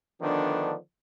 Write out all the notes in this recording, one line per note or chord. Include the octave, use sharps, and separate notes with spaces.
D3 D#3 F3 A3 B3 D4